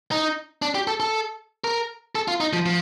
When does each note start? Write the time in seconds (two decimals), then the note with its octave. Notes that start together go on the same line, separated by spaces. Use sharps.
0.11 D#4
0.62 D4
0.75 G4
0.87 A4
1.00 A4
1.64 A#4
2.15 A4
2.28 F4
2.40 D#4
2.53 F3
2.66 F3